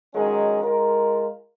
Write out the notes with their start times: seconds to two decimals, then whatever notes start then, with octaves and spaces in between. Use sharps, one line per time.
0.14 D#3 F#3 G#3 C#4 D#4
0.63 G#3 F4 A#4